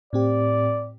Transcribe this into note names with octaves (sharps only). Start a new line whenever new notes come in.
A2 C4 G4 D5